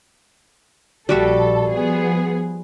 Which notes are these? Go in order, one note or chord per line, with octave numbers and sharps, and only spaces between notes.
A#1 G3 F#4 A4 E5
F3 B3 G#4